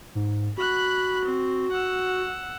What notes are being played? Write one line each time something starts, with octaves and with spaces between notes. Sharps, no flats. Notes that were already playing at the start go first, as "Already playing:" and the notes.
G#2
F#4 B5 F#6
C4
F#5 E6